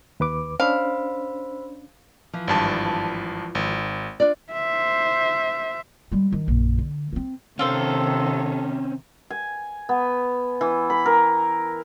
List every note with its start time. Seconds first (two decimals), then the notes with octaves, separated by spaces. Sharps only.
0.20 D#2 B4 D6
0.60 C#4 D4 C5 F5 B5 E6
2.33 E3 F3
2.48 G#1 G2 A5
3.55 G#1
4.20 D4 F4 D5
4.53 C5 E5
6.12 G3 G#3
6.32 D#3
6.48 A#1 F#2
6.78 D3
7.13 A#3 C4
7.59 C3 D#3 C4 C#4 F4 A4 C5
9.30 G#5
9.89 B3
10.61 E3
10.90 B5
11.06 A#4